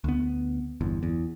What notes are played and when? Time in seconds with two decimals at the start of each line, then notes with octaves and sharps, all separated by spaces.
0.04 D2 B3
0.81 G1 E2
1.03 E2